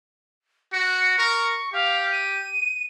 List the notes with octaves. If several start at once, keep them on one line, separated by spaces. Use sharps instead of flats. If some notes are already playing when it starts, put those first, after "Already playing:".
F#4 C#7
A#4 C#6
G4 F5
D#7